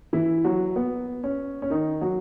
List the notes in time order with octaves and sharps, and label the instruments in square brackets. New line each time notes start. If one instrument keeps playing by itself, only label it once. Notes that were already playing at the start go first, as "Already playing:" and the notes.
[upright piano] E3 E4
F#3 F#4
B3
C#4
C#4
D#3 D#4
F#3 F#4